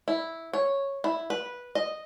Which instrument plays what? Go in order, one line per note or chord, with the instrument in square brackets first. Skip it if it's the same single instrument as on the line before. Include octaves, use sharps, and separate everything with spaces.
[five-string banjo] E4
C#5
E4
B4
D#5